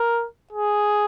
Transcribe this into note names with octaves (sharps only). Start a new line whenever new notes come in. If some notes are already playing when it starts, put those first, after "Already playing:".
Already playing: A#4
G#4